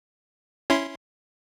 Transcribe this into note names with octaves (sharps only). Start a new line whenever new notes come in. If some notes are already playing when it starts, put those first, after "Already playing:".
C#4 E4 C6